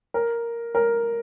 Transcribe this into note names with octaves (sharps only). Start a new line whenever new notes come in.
A#4
A#4